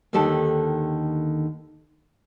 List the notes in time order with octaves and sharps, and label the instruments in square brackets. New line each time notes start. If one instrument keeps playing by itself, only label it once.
[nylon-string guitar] D#2 D3 D#3 G4 A4 A5